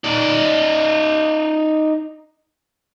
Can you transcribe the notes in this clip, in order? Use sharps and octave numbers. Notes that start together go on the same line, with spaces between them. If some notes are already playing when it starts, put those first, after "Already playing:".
D#4 D5